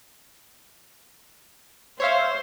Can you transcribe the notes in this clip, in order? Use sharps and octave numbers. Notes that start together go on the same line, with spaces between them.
C5 C#5 E5 F5